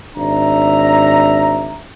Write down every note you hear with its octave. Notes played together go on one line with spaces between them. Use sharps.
G#1 D4 E5 A#5